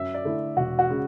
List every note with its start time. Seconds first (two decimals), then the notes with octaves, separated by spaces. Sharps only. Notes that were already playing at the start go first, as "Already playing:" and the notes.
Already playing: F#2 E5
0.14 D5
0.25 D3 A3 E4
0.57 E1 F#4
0.79 F#4
0.90 C#3 G#3